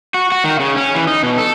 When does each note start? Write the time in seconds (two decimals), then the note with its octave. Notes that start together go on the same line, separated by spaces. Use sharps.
0.14 F#4
0.32 F#4
0.44 D#3
0.59 C#3
0.76 C#4
0.95 E3
1.07 D#4
1.23 B2
1.38 A4